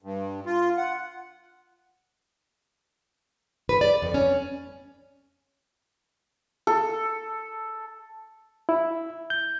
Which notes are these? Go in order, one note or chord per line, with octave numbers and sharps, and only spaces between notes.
G2
F4
F#5
B4
D5
F2
C#4
A4
E4
G6